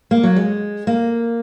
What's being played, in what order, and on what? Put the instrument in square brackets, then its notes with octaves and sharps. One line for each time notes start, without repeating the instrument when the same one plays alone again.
[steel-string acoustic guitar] A#3
F#3
G#3
A#3